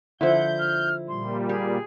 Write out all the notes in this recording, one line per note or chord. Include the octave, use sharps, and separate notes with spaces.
D3 F3 E4 F#5 G6
F6
A#2 G3 C6
G4 G#4